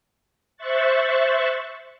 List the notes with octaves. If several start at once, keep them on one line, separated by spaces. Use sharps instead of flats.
C5 E5 C#6 F#6 A6